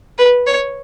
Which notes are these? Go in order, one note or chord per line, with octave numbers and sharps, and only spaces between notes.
B4
C#5